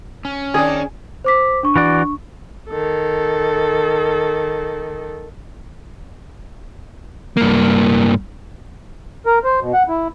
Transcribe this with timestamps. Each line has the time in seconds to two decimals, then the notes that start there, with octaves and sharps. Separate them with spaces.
0.25 C#4
0.54 D#3 D4 G#4
1.24 C5 D6 B6
1.63 D4 C#6
1.76 E3 F#4 D5
2.70 D#3 A4
7.37 G2 A#3
9.26 A#4
9.44 C5
9.60 B2
9.73 F#5
9.89 E4